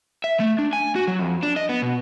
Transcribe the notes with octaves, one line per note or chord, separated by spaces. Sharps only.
E5
A3
D4
G#5
F#4
F#3
F2
D4
D#5
B3
B2